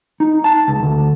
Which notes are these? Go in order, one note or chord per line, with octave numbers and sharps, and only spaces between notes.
D#4
A5
C#2
D2